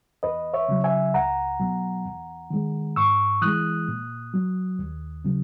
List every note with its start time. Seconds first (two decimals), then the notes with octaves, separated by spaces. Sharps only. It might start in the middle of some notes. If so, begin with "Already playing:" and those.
0.23 E2 B4 D#5
0.54 C#5 E5
0.69 C#3 F#3
0.84 E5 G#5
1.14 C#2 F#5 A#5
1.60 B2 F#3
2.06 E2
2.50 D#3 G#3
2.96 G#2 C#6 E6
3.42 E3 G#3 D#6 F#6
3.88 A#2
4.34 F#3
4.79 D#2
5.25 C#3 F#3